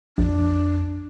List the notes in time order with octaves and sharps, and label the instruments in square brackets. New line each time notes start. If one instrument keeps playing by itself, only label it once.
[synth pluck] A#1 [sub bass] F2 [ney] D4